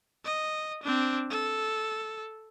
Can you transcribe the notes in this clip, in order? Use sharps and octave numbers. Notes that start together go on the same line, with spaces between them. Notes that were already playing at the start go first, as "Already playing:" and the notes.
D#5
C4 D4
A4